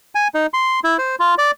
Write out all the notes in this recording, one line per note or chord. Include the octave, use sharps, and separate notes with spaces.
G#5
D#4
C6
E4
C5
F4
D5